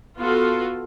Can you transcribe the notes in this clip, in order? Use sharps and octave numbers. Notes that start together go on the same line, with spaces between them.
B3 F4 F#4 A4